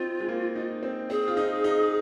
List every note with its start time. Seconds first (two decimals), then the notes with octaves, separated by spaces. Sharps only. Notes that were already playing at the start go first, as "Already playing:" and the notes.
Already playing: C4 D#4 F4
0.20 G#3
0.28 A#3
0.55 D#4
0.83 C4
1.10 C4 G#4
1.28 F4
1.37 D#4
1.64 D#4